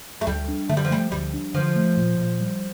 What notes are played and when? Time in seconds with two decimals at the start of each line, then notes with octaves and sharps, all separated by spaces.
0.21 A3
0.27 D2 G3
0.48 D4
0.69 D3 A3
0.77 G3
0.85 F3
0.91 G3 A3
1.12 D2 G3
1.34 D4
1.54 D3 F3
1.76 A3
1.97 A#2
2.18 A#2
2.40 G3